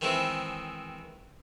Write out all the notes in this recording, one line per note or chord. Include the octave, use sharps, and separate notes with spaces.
D#3 E3 G#3 C4 E4